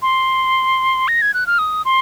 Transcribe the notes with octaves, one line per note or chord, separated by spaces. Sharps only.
C6
A#6
G#6
F#6
F6
D#6
C6